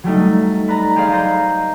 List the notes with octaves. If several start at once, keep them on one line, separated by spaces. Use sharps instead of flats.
F#3 G3 A3 D#4
B4 D5 A#5
G4 G#4 C5 D5 F5
C5 D#5 A#5 G6